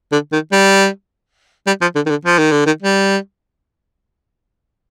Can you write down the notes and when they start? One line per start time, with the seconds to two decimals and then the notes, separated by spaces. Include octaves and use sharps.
0.12 D3
0.32 D#3
0.52 G3
1.67 G3
1.81 F3
1.95 D3
2.06 D#3
2.10 D3
2.25 F3
2.38 D#3
2.51 D3
2.66 D#3
2.82 G3